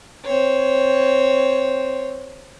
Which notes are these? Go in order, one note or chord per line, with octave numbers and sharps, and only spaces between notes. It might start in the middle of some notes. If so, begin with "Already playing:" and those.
C4 C#5